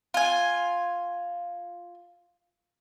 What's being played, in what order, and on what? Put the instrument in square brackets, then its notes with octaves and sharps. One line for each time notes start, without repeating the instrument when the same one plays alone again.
[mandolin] F4 G#5